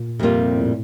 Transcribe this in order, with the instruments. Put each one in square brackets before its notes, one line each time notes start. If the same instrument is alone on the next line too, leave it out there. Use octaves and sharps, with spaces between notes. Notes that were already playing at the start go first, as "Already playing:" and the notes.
Already playing: [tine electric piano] A#2
[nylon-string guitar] F2 C3 G3 A#3 F4
[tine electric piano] A2